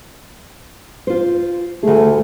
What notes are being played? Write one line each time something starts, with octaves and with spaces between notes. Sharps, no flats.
F4 C5
D2 A3 G#4